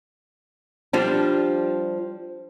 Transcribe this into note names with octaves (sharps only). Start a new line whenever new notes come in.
F3 G3 D4